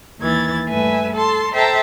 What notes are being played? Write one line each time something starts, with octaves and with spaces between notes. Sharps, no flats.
D#2 E3 G#6 A6
G2 A3 B4 E5 G#5
A4 A5 C6
A4 C5 E5 G5 A5 A#5